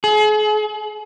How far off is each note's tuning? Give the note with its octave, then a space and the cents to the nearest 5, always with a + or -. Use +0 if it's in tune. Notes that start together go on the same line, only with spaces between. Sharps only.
G#4 +40